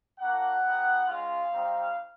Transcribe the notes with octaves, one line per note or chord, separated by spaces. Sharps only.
A#3 D4 F#4 F#5
B3 D#4 G4
G#3 C#4 F4 F5
G3 C4 D#4